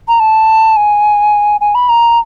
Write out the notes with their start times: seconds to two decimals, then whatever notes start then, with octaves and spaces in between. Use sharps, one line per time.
0.08 A#5
0.20 A5
0.77 G#5
1.61 G#5
1.75 B5
1.89 A#5